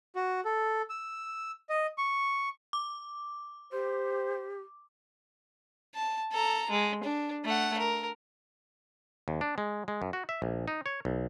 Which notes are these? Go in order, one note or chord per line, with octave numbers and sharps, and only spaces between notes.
F#4
A4
E6
D#5
C#6
D6
G4 C5
A5
A4 A#5
G#3
D4
A3 F#5
A#4
D#2
D4
G#3
G#3
F#2
F#4
E5
A#1
D#4
C#5
B1